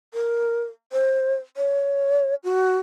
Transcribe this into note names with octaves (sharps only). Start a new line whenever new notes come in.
A#4
C5
C#5
F#4